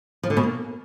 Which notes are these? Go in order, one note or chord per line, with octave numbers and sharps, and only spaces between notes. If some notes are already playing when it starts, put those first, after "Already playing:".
F3
D3
B2
A#3